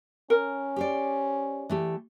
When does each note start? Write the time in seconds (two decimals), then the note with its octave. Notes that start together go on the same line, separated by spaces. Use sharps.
0.30 C#4 A#4
0.76 G4 C5 D5
1.69 E3 A3 G4